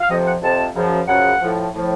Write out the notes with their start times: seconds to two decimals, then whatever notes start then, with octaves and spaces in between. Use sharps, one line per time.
0.01 F5
0.09 F2 C3 F3 D#5
0.26 F#5
0.42 F2 C3 F3 A5
0.75 F#2 C#3 F3
1.07 F#2 C#3 F3 F#5
1.42 A2 F3
1.74 A2 F3